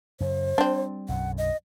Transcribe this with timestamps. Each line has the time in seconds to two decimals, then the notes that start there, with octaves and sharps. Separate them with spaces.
0.20 F#2 C#3 C5
0.58 G3 C4 D4
1.09 B1 F#2 F#5
1.38 D#5